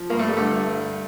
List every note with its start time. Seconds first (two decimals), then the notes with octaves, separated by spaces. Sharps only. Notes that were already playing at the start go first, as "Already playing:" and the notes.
Already playing: F3
0.10 G2 A#3
0.19 A3
0.28 G3
0.37 D3 A3
0.67 G2